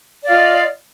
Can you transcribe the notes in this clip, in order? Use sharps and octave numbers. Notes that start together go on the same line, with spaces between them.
F4 D5 D#5 F5